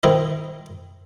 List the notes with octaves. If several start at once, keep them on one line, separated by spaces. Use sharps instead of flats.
D#3 C4 E4 D#5